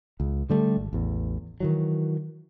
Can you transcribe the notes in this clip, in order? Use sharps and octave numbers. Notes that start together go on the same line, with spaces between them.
C#2
D3 G3 A3
G#1
A1 E2
D#3 E3 F#3